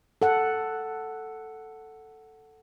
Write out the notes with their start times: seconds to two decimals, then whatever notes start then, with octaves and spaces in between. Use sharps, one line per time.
0.22 A4 F#5